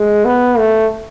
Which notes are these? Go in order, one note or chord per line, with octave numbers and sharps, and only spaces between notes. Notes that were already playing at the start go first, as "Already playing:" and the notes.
Already playing: G#3
B3
A3